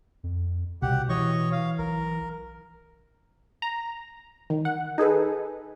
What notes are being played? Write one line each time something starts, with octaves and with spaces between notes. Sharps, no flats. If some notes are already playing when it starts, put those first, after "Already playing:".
F2
C2 B2 G4 F#5
E3 C#5 D#5 C#6
F5
B1 A#4
A#5
D#3
F#5
D#4 G#4 A4 B4